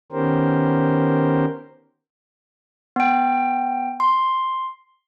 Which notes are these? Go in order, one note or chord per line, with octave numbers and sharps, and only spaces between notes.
D#3 B3 C#4 G4 A#4 C5
B3 G5
C6